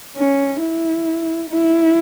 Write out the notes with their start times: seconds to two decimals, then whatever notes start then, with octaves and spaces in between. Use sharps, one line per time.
0.17 C#4
0.61 E4
1.50 E4